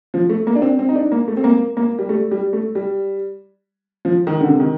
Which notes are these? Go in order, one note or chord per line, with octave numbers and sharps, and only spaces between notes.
F3
A3
A#3
D4
C4
C4
D#4
D4
A#3
A3
C4
A#3
A#3
G3
A3
G3
A3
G3
F3
D#3
D3
C3
D#3